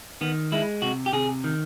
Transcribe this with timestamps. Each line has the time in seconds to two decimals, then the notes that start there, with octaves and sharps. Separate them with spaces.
0.21 D#3 B3
0.52 G#3 E4
0.82 C3 F#4
1.06 G4
1.13 C3 G#4
1.44 D#3